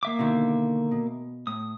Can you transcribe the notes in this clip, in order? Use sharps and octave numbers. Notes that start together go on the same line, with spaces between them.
A#3 E5 D6
B2 D3 D#3
B2
A2 D#6